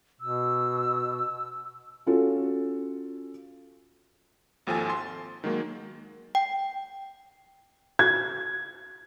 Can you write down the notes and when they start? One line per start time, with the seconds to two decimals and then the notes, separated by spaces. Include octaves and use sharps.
0.21 B2 E6
2.06 C#4 F4 F#4 A4
4.67 G#1 D#2 F3 A4 G#5 A6
4.90 C6
5.44 D#3 F#3 G#3 A#3
6.35 G5
7.99 G#6